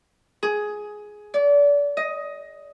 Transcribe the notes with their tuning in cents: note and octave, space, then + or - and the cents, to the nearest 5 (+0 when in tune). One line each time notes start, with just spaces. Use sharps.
G#4 +10
D5 -30
D#5 +10